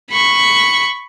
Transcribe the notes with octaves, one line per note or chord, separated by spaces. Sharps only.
B5 C#6